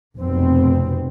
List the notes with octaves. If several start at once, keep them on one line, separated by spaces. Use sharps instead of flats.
F1 F#2 B2 C4